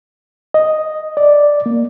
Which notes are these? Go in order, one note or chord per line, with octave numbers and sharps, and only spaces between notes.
D#5
D5
A#3